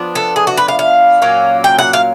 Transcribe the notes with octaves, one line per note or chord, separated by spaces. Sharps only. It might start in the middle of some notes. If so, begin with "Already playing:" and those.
Already playing: F3 B3 D4
A4
G#4
F#4
B4
F5
F5
A#2 F#3 A#3 C#4
G5
F#5
F5